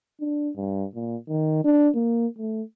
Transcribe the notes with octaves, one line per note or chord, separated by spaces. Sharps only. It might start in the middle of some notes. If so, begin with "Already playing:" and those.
D4
G2
A#2
D#3
D4
A#3
A3